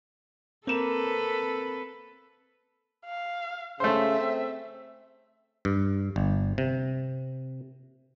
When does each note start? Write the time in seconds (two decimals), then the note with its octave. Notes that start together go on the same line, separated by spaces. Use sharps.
0.67 A#3 C4 A4 B4 E7
3.06 F5
3.80 C#3 A3 C5 E5
4.20 C4
5.65 G2
6.16 G1
6.58 C3